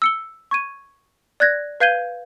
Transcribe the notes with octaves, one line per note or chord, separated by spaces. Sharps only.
E6 C#7 G7
C#6 G#6 D#7
D5 F#6 G#6 A#6
B4 F5 G6 G#6 D#7 G7